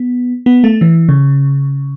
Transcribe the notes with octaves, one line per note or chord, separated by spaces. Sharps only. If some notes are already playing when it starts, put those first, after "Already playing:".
Already playing: B3
B3
A3
E3
C#3